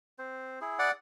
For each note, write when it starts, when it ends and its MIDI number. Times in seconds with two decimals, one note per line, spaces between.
0.19 0.59 60
0.19 0.59 72
0.61 0.89 64
0.61 0.89 68
0.79 0.91 74
0.79 0.91 78